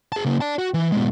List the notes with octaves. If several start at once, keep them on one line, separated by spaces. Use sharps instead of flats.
G#4 A5
C#3 A#3
D5 A5
F#4
E3
G#2 B2